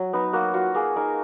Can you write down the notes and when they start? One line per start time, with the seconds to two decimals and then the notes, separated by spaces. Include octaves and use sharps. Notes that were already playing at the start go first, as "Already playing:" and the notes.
Already playing: F#3
0.13 B3 D#4
0.33 A#3 F#4
0.54 F4 F#4
0.75 A#3 G#4
0.96 D#4 A#4